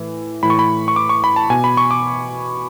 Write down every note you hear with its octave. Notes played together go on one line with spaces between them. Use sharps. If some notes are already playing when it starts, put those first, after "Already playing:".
Already playing: A2 E3
A2 E3 B5
C#6
B5
C#6
D6
C#6
B5
A5
B2 G#5
B5
C#6
D6